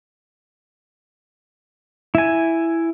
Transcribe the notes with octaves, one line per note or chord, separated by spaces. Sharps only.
E4 G#5